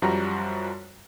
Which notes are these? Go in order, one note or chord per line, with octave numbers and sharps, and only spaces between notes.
F#2 F3 G3 F#4 A#5